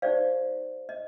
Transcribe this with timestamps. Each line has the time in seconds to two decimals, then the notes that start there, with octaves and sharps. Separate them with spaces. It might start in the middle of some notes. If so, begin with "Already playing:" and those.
0.02 D#4 G4 C5 D5 F5
0.89 D#5